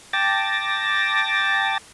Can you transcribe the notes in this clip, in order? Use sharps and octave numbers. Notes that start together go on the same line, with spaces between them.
G5 A5 D6 A6 A#6